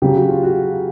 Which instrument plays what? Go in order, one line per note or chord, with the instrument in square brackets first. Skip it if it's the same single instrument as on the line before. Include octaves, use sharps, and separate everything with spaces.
[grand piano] C#3 F#3 G4
F#4
F4
F#4